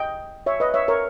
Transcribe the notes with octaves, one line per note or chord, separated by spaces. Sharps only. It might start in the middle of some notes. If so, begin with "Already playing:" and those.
Already playing: D#5 G5
C#5 E5
B4 D#5
C#5 E5
A#4 C#5